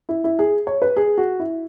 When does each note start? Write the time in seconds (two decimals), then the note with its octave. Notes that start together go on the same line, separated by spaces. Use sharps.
0.09 E4
0.24 E4
0.39 G#4
0.67 C#5
0.82 B4
0.97 G#4
1.18 F#4
1.40 E4